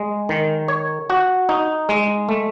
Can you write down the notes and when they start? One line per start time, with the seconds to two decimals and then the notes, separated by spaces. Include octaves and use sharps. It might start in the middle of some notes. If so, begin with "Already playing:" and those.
Already playing: G#3
0.29 D#3
0.68 C#5
1.10 F#4
1.49 D#4
1.89 G#3
2.29 A3